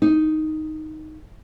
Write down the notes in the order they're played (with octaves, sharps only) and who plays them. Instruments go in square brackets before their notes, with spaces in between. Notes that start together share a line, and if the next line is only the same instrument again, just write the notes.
[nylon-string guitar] D#4